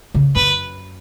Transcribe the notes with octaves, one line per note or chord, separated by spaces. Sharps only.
C#3
F#2 B4